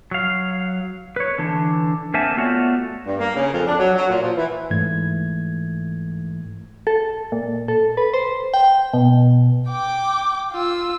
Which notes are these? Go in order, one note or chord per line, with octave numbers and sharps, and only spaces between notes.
F#3 F5
B4 C#5
D3 E3 D4
A#3 C4 E5 F#5 G#5 A5
A3 B3 F4 F#4 C#5 D5
G2
A#3
C#3
F2
D4
F#3
F#3
A#2
F3
E3
G#2 E3 A3 G#6
A4
A#2
A4
B4
C5
G5
B2
G5 D6
F4 E6